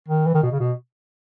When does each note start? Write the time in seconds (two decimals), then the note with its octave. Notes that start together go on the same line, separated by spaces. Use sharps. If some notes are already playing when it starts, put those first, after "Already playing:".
0.08 D#3
0.26 E3
0.34 D#3
0.43 B2
0.52 C#3
0.60 B2